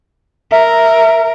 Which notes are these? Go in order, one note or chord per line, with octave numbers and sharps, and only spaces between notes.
A#4 E5